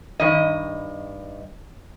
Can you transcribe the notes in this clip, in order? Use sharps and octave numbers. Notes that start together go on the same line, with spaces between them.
G2 D#3 D#5